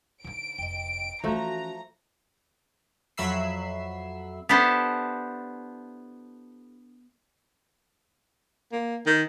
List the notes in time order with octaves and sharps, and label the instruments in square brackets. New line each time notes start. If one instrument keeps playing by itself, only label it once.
[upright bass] D3 D#4 [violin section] D7
[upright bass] F1 [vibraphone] D#5 G5
[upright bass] E3 C#4 [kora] F3 A3 [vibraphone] F#4 [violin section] A#5
[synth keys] F2 F#3 E5 B5 E6 C7
[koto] B3 D4 E4 G4 A4 C5
[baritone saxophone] A#3
D#3